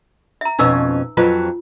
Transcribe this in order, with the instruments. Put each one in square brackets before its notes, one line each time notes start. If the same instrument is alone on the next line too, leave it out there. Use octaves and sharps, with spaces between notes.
[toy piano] E5 A#5
[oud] F2 B2 C#4 [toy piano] D#4 B4 E6
[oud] F2 F#3 B4 [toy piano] F4